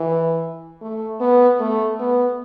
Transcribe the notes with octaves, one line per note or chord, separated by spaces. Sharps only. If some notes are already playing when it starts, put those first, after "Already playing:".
Already playing: E3
A3
B3
A3
B3